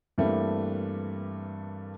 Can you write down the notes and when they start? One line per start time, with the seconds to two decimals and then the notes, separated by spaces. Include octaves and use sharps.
0.18 G2 E3 G3 A3 A#3 C4